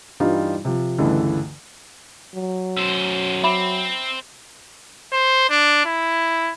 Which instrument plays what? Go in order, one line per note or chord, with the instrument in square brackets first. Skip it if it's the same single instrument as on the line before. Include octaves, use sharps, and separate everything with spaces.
[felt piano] G2 E3 G3 D#4 F4
C3 F3
C#2 G2 D3 E3 A3
[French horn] F#3
[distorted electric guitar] F#2 C5 [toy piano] E6
[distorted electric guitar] C4 [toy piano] E5 B5 D6
[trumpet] C5
D4
E4